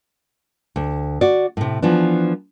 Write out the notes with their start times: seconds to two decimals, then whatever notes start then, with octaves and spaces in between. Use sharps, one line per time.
0.76 D2
1.21 F#4 D5
1.57 A2 C3
1.82 E3 F3 B3 D4